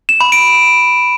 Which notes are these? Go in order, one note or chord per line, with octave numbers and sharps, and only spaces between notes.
E7
B5
D7